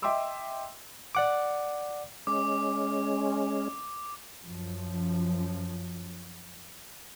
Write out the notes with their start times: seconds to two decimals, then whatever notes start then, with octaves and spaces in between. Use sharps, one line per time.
0.02 D#5 E5 G5 C6 D6 E6
1.15 D5 F#5 D6
2.27 G#3 C#4 D6
4.43 F#2 F3